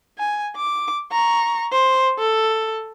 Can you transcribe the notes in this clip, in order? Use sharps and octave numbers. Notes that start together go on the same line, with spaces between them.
G#5
D6
A#5 C#6
C5
A4